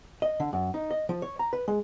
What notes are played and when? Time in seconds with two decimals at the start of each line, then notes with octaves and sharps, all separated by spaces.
0.22 D#5
0.40 D3
0.53 F#2
0.74 D#4
0.91 D#5
1.09 F3
1.22 C#5
1.39 A#5
1.53 B4
1.68 G#3